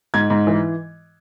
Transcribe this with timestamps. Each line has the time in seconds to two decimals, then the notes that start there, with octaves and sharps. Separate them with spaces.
0.14 G#2 G#6
0.30 G#2
0.47 E3